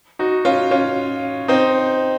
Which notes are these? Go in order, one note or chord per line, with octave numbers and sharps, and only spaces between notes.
D#4 F#4
C#4 F4
C#4 F4
C4 D#4